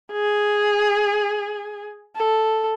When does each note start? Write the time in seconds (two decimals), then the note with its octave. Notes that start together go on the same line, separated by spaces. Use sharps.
0.12 G#4
2.16 A4